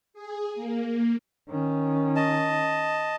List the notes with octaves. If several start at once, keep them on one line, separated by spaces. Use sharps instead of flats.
G#4
A#3
D#3 C#4
D#5 A5